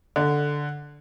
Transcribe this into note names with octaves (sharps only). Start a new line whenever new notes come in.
D3